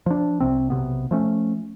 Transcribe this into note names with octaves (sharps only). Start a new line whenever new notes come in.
F3 D4
C2 C3 C4
B1 G#2 C3 B3
F3 A3 C#4